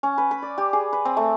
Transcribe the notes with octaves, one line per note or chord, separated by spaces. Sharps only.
C#4
B4
B5
D5
G4
G#4
B4
C4
A3